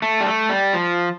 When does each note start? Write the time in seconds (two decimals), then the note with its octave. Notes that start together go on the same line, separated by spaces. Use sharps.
0.02 A3
0.20 G3
0.26 A3
0.49 G3
0.73 F3